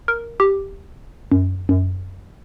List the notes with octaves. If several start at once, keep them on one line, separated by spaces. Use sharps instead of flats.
A#4
G4
F#2
F#2